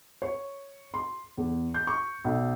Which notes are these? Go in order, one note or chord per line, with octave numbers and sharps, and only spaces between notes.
C#5
C6
E2
G6
C#6
B1